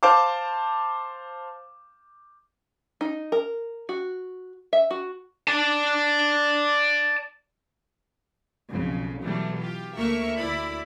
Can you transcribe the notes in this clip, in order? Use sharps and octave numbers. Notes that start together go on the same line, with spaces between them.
C5 F5 A5 D6
D#4
A#4
F#4
E5
F#4
D5 A5
B1 F2 C#3
B2 E3 F#3 G3 A3
F4 G4
D2 A3 A#3 A#4 E5 C#6
D2 E4 D5 B5